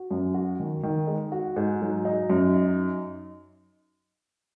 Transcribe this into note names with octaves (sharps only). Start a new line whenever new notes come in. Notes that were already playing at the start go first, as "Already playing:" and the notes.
Already playing: F#4
F#2
F#4
D#3
D#3
G#3
F#4
G#2
F#3
D#4
F#2
D#4